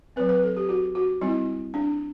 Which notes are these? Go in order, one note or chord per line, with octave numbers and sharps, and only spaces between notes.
F#3 C4 B4
B4
A4
G4
F#4
F#4
G3 C4 E4
D4